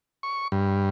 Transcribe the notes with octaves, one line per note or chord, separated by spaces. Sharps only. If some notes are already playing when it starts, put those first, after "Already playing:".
C#6
G2